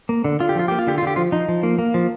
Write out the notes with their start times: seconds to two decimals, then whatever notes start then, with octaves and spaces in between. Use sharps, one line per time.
0.09 A#3
0.24 D3
0.40 D3 F4
0.49 G4
0.55 F3 F4
0.68 A#3 G4
0.79 F4
0.87 D3 G4
0.98 F4
1.02 D3 G4
1.16 F3 F4
1.32 F3 D#4
1.49 F3
1.63 A#3
1.79 A#3
1.94 F3